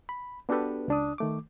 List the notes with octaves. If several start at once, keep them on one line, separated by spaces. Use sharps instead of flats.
B5
B3 D4 F#4 G4 A4 B4
C#2 D4 D#6
D#3 A3 D6